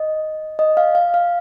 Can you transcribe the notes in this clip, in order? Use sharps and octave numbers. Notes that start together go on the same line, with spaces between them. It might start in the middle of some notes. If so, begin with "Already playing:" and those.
Already playing: D#5
D#5
F5
F5
F5